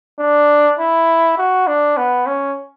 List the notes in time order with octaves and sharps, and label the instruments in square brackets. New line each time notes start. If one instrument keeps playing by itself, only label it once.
[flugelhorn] D4
E4
F#4
D4
B3
C#4